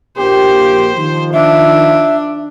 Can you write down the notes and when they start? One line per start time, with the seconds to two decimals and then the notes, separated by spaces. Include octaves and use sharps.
0.17 A#1 A#3 G4 C5
0.97 D#3 F3
1.33 D4 E5